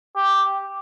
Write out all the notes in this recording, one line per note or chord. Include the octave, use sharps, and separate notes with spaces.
G4